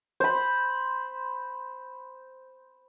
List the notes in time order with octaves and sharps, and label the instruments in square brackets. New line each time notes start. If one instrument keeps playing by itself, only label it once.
[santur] C5 B5